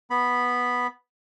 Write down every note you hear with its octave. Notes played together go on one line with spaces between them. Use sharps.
B3 B5